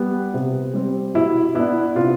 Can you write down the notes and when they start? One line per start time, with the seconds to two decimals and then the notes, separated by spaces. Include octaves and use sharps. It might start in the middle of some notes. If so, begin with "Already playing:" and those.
Already playing: G3 B3
0.34 C3
0.73 G3 C4
1.14 B2 E4
1.55 B3 D4 E4
1.95 C3 F4